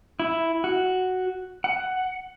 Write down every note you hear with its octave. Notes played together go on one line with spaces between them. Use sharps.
E4
F#4
F#5